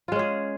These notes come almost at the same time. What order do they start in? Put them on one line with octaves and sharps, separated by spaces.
F4 G#3 C#4 G#4